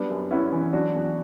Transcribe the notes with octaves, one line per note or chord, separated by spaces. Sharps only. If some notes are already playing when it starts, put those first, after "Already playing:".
Already playing: F#3 G3 B3 D4
F#2
B3 C#4 E4
E3
F#3 D4 F#4
E2